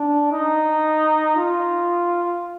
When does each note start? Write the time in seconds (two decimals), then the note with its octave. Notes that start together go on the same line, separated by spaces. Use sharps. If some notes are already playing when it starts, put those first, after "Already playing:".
Already playing: D4
0.32 D#4
1.37 F4